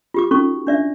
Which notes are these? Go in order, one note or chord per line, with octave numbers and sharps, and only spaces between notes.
F4 G4 D6
C#4 D#4 F#4 A4 C#6
D4 D5 E5